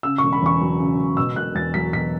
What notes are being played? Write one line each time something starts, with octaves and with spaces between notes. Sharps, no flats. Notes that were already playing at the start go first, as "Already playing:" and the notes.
C#3 E6
E1 C#6
B5
E2 C#6
F#3
C#3
E1
B2 E6
E1 F#6
E2 A6
F#3 B6
B2 B6